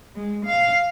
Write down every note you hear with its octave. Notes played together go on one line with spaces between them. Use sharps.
G#3
F5